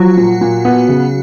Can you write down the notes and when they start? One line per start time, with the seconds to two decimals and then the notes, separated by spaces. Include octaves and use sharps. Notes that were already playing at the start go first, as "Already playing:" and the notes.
Already playing: F3 F#3 F#4
0.17 A#2
0.41 A#2
0.65 B3
0.89 C#3